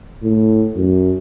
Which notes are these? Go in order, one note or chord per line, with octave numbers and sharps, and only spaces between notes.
A2
F#2